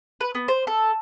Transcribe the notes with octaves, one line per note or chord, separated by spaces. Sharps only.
B4
B3
C5
A4